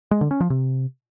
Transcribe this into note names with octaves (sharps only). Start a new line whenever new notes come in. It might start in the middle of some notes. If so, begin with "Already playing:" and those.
G#3
D3
C#4
F3
C3